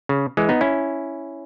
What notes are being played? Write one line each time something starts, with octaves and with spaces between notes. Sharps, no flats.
C#3
E3 G#3
B3 D#4
C#4 E4